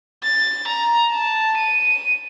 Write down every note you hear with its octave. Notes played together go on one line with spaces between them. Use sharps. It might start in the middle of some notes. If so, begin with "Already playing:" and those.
A6
A#5
A5
D#7